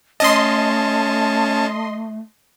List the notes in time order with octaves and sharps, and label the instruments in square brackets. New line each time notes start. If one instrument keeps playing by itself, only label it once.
[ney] A3 [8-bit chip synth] C#4 A5 [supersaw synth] D#5 C6